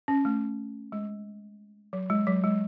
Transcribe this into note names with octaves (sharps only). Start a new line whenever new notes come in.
C#4
A3
G#3
F#3
G#3
F#3
G#3